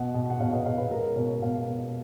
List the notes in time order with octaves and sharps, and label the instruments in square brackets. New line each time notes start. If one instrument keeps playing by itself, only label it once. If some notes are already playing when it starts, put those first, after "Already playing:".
Already playing: [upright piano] B2 D#5 F#5
B2
F#5
B2 C#5 F5
B4 D#5
B2 C#5 F5
B4
G#3 A#4
B2 A#4 C#5
B2 C#5 F5
B2